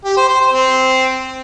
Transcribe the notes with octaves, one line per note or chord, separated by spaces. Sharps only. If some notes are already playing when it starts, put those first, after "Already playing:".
G4
C5
C5
C5
C4